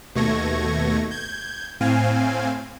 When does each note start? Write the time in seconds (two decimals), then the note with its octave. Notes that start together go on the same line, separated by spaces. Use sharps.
0.15 D#2 B2 A3 C#6 G#6 A#6
1.11 G6 G#6
1.80 A2 C4 F5 G#5